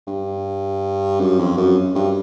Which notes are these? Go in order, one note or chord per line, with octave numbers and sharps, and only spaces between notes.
G2
F#2
F2
F#2
G2